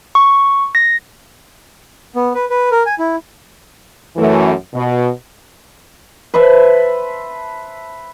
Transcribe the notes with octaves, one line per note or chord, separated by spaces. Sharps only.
C#6
A#6
B3
B4
B4
A#4
G#5
E4
F#2 E3 A3
B2
B4 C5 E5 A5